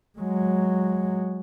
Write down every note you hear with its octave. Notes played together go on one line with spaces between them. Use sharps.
F#3 G#3